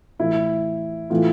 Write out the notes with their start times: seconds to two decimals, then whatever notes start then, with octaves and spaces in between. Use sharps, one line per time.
0.19 A2 E3 E4
1.10 A2 E3 F4